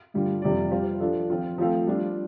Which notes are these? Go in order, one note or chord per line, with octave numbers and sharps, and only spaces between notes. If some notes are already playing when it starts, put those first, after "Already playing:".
G2 D3 G3 F4
F2 C3 G3 F4 D5
G3 F4 C5 F5
F3 D4 A4
F3 C4 F4
F3 A3 C4 A4 F5
G3 D4 F4